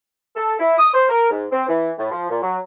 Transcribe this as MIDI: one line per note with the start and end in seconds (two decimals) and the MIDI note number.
0.35 0.55 69
0.59 0.77 64
0.78 0.93 87
0.94 1.09 72
1.09 1.30 70
1.31 1.45 44
1.51 1.63 60
1.68 1.91 52
1.97 2.11 45
2.11 2.27 53
2.30 2.41 46
2.41 2.58 54